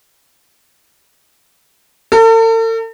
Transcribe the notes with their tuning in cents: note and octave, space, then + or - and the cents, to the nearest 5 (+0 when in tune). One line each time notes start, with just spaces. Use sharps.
A4 +45